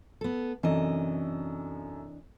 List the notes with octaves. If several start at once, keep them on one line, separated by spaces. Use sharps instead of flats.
B3 A4
F#2 C3 E3 D4 A4 D#5